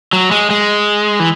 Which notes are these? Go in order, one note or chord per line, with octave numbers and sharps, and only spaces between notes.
F#3
G#3
G#3
E3